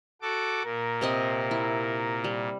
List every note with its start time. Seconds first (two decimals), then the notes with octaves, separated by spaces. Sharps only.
0.22 F#4 A4 D6
0.64 A#2 A#4
1.01 C3 C4 D#5
1.51 E4
2.24 G3